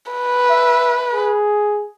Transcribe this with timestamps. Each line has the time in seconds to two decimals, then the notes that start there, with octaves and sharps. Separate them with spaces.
0.13 B4
0.50 E5
1.14 G#4